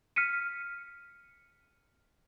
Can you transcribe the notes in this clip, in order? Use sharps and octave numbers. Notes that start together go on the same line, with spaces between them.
F6 B6 C#7 D#7